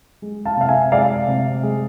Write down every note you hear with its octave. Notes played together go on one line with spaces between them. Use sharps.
G#3
F5 A5
C3 F5
E5 G#5
G#3 D5 F5
C3
G#3